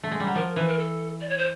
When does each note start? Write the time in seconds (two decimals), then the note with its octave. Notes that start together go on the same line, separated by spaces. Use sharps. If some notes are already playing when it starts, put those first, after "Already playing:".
0.03 A3
0.11 G#3
0.20 G3
0.27 F#3
0.35 F3 A#4
0.56 E3 B4
0.68 A#4
0.79 A4
1.21 D5
1.29 C#5
1.38 C5